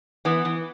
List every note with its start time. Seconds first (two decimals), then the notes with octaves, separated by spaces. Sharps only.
0.25 E3 B3
0.45 E3